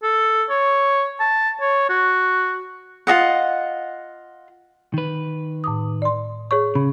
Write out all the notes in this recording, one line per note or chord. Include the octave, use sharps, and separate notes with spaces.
A4
C#5
A5
C#5
F#4
F4 F#4 D#5 F#5
D#3 B4
A2 D6 D#6
D5 C6
G#4 C#5 C#6
C#3 B5